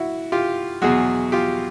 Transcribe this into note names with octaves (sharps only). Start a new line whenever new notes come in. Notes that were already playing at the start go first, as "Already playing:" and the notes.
Already playing: E4 F#4
F4 G4
E2 B2 F#3 F#4 G#4
F4 G4